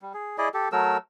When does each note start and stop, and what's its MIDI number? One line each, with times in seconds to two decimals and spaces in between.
0.02 0.13 55
0.14 0.37 68
0.38 0.49 64
0.38 0.49 68
0.38 0.49 74
0.38 0.49 75
0.54 0.69 67
0.54 0.69 69
0.72 0.97 54
0.72 0.97 57
0.72 0.97 70
0.72 0.97 88